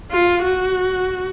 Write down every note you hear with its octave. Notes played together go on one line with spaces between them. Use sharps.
F4
F#4